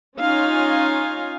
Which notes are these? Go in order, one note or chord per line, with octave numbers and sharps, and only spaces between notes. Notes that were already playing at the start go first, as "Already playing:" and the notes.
C#4 D#4 F4 F5 G#5